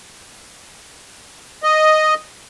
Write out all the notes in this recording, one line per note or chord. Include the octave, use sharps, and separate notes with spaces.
D#5